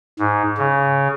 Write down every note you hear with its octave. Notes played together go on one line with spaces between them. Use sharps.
G#2
C#3